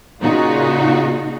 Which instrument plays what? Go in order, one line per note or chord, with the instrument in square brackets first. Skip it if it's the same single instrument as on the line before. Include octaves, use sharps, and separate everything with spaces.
[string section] A#2 C#3 D#4 F4 F#4